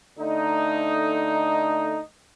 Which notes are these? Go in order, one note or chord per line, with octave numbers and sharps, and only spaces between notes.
D3 A3 D#4